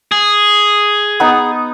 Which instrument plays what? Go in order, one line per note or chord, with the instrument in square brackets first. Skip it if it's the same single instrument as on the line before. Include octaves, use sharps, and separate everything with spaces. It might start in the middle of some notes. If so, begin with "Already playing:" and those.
[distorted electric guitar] G#4
[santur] B3 D#4